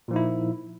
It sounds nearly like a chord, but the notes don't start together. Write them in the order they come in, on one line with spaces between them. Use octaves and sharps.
A#2 F3 D#4 E4